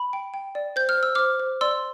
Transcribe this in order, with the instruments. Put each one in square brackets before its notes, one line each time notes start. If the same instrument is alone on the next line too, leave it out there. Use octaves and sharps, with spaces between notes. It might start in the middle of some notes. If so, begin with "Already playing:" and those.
Already playing: [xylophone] B5
G5
G5
D5
C5 G6
F6
C5
E6
C5 D6 F6
C5
D5 C6 E6